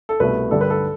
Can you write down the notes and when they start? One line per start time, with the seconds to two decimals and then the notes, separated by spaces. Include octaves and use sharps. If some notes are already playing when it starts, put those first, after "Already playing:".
0.09 A4
0.20 C2 B2 A3 B4
0.51 G2 D3 G3 A4
0.61 B4
0.70 A4